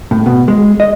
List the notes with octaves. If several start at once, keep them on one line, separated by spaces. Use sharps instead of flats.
A2
B2
G#3
D#5